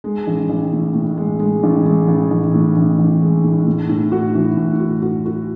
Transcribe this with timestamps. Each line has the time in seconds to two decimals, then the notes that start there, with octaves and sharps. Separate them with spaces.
0.04 G#3
0.27 A1
0.49 A1
0.72 A2
0.94 A2
1.17 G#3
1.39 G#3
1.63 A1
1.85 G#3
2.08 A1
2.31 A1
2.54 A2
2.76 A1
2.98 A1
3.21 G#3
3.44 A2
3.66 A2
3.89 A2
4.12 F#4
4.35 E3
4.57 A2
4.80 F#4
5.02 F#4
5.26 F#4